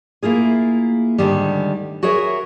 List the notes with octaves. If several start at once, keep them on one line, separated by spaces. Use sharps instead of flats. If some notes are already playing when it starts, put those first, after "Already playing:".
A#3 E4 F4 G#4
D2 G#2 D3 D#3 G3
F#4 G#4 A#4 C#5 E5